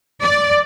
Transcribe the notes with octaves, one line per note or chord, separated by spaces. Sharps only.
D5